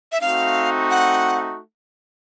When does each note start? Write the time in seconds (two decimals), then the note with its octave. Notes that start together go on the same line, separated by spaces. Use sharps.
0.12 E5
0.21 A3 C4 D#4 F#4 F5
0.90 F#5